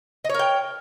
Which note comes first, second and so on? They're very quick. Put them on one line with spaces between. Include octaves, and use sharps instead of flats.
D#5 C#5 A#4 G5